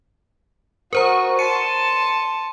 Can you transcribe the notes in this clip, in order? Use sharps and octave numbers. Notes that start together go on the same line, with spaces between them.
F#4 A#4 C5 A#5 C#6
A5 C6 C#7 D#7